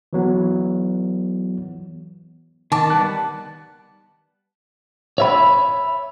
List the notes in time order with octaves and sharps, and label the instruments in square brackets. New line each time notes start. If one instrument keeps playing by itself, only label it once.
[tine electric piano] E3 F#3 B3
[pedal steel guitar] D#3 D6 [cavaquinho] A5
[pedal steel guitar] G3 B3 F#6
[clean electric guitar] C#5 E5 B5